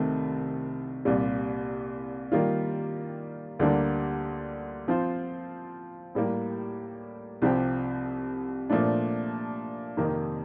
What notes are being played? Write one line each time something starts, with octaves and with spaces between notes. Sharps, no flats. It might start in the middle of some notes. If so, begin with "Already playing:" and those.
Already playing: C2 C3 D#3 A3 C4
C2 A#2 G3
D#3 G3 A#3 F4
D2 D3 G3 A#3 D4
F3 C4 F4 C5
A2 G3 A#3
C2 C3 F3 C4 G4
A#2 F3 A3 D4
F2 C3 D#3 A#3